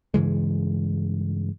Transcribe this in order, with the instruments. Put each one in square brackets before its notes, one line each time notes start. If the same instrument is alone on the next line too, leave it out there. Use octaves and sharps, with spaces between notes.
[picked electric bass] G2 C#3 E3 G#3